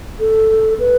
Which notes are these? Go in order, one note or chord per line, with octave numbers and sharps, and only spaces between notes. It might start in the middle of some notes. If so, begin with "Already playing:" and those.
A4
B4